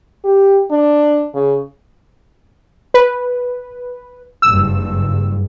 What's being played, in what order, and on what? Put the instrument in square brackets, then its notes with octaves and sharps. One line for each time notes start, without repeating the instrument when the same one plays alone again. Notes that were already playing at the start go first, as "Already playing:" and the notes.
[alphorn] G4
D4
C#3
[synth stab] B4
[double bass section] F#1 G2 [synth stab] E6